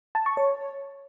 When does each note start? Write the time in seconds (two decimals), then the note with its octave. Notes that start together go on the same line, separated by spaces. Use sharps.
0.15 A5
0.26 C#6
0.37 C#5